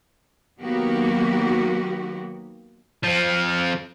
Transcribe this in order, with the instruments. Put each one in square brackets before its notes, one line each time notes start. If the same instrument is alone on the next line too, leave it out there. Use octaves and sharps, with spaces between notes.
[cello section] D#3 F#3 A#3 B3 F#4 G4
[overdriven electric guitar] F3 C4